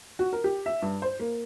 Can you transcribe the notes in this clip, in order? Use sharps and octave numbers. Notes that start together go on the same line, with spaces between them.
F#4
A#4
G4
E5
G2
C5
A#3